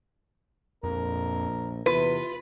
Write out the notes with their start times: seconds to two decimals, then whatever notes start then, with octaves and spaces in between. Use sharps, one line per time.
0.84 A#1 F2 A#4
1.86 E2 C3 F4 B4